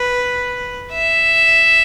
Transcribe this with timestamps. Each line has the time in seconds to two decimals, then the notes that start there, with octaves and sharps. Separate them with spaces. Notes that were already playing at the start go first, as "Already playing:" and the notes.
Already playing: B4
0.93 E5